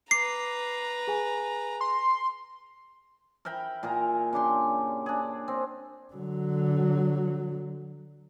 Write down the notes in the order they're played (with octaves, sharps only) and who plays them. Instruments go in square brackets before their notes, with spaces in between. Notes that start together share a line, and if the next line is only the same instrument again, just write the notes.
[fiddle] B4 A#5 [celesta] D6 [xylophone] C7
[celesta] G#4 G#5
[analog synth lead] C6
[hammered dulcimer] A#4 E5 G5 B5
A#2 G#4 A#4 A#5
C#3 D4 G4 C6
D4 G#4
C4
[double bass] D3 F#3